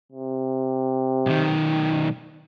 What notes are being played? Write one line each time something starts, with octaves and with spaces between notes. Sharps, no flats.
C3
B1 D#3